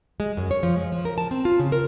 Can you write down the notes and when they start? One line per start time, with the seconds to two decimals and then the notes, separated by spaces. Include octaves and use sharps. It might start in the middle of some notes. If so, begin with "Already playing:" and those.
0.20 G#3
0.37 F#2
0.51 C#5
0.63 F3
0.76 G#3
0.92 F3
1.05 A#4
1.18 A5
1.31 C4
1.45 F4
1.59 C#3
1.72 A#4